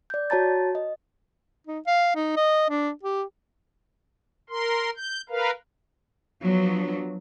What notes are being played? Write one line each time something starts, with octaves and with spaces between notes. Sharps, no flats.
D5 G6
F#4 C#5 A5 A#5 A6
D#5
D#4
F5
D#4
D#5
D4
G4
A#4 C6
G6
A#4 B4 F5
F3 F#3 B3 D4